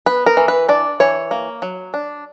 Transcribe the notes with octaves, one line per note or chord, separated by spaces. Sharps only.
B3 B4
A#4
E3
B4
D4 D5
E3 C#5
A#3
F#3
D4